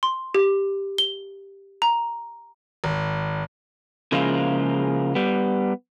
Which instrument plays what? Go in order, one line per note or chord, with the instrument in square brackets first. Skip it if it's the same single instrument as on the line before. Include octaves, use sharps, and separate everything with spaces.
[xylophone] C6
G4
G7
A#5
[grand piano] G#1
[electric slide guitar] C#3 F3 G#3 A#3 E4 F4
G3 B3